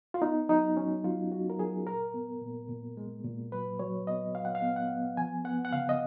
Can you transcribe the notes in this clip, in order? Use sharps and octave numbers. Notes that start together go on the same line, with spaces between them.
F4
B3 D#4
F#3 D#4
F#3 C#4
F#3 F4
F#3 F#4
A#4
F#3 G#4
A#2 A#4
B3
A#2
A#2
G#3
A#2
F#3 B4
F#3 C#5
B3 D#5
F#3 F5
F#5
F5
B3
F#5
B3
F3 G#5
B3 F#5
F#5
C#3 F5
D#5